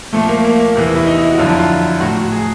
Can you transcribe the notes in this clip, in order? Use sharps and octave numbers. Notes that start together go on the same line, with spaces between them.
A#2 F3 A3
A#3
A#3
A#3
E2 C3 E3
E4
D#4
E4
F#4
F2 D3 F#3 F4
E4
F4
A2 F#3 F#4
F#4
G#4